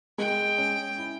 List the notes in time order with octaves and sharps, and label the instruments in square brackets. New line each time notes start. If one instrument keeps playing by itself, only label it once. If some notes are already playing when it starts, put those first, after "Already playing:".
[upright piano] G#3 [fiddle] G5
[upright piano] C#4
E4